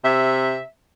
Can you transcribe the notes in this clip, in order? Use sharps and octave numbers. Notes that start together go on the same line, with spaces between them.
C3 E5